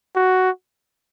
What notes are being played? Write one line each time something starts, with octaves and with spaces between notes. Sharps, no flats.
F#4